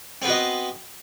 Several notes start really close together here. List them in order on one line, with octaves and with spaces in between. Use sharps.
C4 B3 F#4 D#5